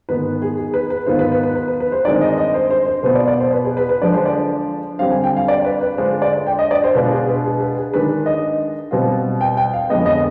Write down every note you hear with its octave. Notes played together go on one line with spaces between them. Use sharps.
G#2 D#3 B3 B4
G#4
G#4
B4
B4
G#2 D#3 B3 F4 C5
B4
B4
B4
B4
B4
B4
C5
G2 D#3 G#3 C4 D#4 D5
D#5
D#5
C5
C5
C5
B2 B3 F4 C5
D5
D5
C5
B4
G#4
B4
B4
D3 F3 G#3 D4 D5
C5
D5
D3 G3 C4 F5
G#5
G5
F5
D5
B4
B4
D3 G#3 D4 F4 C5
D5
G5
D#5
D5
C5
B2 G#3 D4 F4 B4
G#4
B4
G#4
B4
G#4
D#3 G#3 D4 B4
D#5
B2 G3 C4 F4
G5
G5
F5
F2 D3 G#3 B3 D#5
D#5